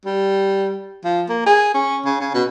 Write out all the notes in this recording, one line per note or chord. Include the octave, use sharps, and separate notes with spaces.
G3
F3
A#3
G#4
C#4
C#3
C#3
B2